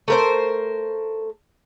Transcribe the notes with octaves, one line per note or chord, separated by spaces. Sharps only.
A3 A#4 C5